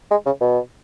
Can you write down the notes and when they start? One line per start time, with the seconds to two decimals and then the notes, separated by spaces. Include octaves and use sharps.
0.11 G#3
0.26 C#3
0.41 B2